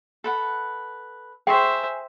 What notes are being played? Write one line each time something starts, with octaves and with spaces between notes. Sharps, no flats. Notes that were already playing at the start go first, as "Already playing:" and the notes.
A4 B4 F#5
G#4 C5 E5 G5 C6 C#6